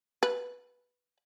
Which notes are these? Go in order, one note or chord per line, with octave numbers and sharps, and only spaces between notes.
B4